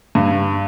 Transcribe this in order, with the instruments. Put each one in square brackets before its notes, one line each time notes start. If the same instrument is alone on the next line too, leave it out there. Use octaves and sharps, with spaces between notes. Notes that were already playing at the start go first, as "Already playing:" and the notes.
[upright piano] G2